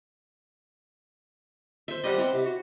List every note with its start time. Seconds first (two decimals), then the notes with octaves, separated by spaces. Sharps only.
1.88 C5 E5
2.04 G3 D#5 F#5
2.18 C4 E4
2.33 C3
2.46 F#4